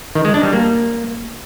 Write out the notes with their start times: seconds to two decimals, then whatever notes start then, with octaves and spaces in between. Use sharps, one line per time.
0.15 D#3
0.25 G#3
0.34 D4
0.43 G3
0.53 A#3